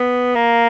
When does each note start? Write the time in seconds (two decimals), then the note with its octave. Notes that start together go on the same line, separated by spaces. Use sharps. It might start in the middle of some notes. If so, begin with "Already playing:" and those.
Already playing: B3
0.35 A#3